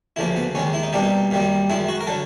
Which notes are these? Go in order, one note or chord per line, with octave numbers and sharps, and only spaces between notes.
D2 C#3 F3 A#3 E4
B3
D#2 D#3 G#3 C#4
E4
D#4
C2 B2 G3 A#3 D4
D#4
F#2 D#3 G3 A#3
F#2 D#3 G#3 E4
F#4
A#4
D3 F#3 A4